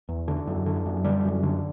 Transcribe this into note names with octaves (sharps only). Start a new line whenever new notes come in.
E2
D3
F#2
D3
F#2
D3 G3
F#2
D3